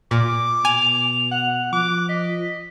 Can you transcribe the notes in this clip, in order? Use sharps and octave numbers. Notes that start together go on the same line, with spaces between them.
A#2 D6
B2 G#5 F7
F#5
F3 D6 F#6
D#5 B6